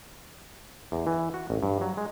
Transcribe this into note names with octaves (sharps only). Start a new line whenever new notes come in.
E2
E3
F#4
A1
G2
F#3
G#3